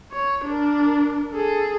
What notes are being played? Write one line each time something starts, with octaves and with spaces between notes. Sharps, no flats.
C#5
D4 A#4
G#4 A4